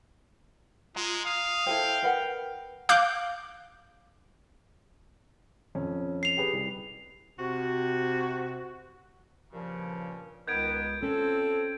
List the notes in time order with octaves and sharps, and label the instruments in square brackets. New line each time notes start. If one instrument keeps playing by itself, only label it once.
[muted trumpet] G#3 [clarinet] F4 [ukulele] A#5
[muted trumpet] F5 [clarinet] D#6
[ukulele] E4 A4 C5 [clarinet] G5
[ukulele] A#4 B4 F#5
[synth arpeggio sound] F5 D6 F#6 G6
[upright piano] F2 C#4
[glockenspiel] C7 F7
[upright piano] G4 G#4 B4
C2
[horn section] C3 F#4
[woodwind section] G2 A#2 C#3 [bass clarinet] F3
[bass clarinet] C#2 [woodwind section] D#3 B3 [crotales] G6 G#6 D7
[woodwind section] F2 C4 [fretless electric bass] C#4 [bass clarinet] A4